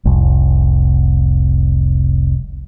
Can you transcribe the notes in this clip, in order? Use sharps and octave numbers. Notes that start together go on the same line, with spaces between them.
F1 C2